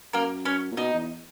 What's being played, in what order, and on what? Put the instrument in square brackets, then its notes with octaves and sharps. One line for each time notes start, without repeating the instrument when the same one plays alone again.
[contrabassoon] F#2 [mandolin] A#3 A#4
[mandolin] C#4 C#5
[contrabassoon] A#2
[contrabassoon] B2 [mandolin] D#4 D#5
[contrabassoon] E2